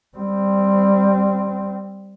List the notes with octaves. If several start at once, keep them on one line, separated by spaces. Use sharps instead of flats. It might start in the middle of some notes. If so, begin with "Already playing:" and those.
G3 C4